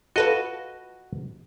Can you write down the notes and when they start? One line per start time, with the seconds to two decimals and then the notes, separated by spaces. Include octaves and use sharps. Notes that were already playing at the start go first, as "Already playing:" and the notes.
0.16 F4 F#4 A4 B4 D#5